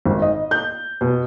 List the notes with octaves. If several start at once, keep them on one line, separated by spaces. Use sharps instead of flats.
G#1
D#5
G6
B2